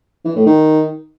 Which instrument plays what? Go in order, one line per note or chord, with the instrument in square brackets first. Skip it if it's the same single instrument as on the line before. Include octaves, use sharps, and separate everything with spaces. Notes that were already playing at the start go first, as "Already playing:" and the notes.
[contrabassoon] E3
A2
D#3